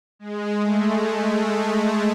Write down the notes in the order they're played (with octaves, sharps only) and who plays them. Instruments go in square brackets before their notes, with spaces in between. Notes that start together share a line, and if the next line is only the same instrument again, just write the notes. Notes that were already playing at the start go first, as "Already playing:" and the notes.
[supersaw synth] G#3
A3
A3
A3